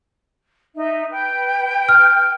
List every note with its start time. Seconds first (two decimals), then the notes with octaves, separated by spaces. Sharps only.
0.76 D#4 E5
1.11 B4 G5
1.89 F6